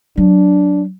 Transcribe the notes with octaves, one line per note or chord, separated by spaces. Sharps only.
F#3 D4